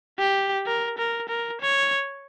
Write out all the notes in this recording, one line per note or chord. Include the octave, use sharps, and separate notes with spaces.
G4
A#4
A#4
A#4
C#5